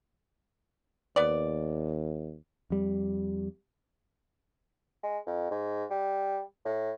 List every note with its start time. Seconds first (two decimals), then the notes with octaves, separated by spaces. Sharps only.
1.16 D#2 B3 D5
2.70 F2 G3
5.03 G#3
5.27 F2
5.51 G#2
5.90 G3
6.65 A2